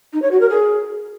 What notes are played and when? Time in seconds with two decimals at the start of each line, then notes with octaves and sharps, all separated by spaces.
0.12 D#4
0.22 C#5
0.31 F#4
0.40 A#4
0.49 G#4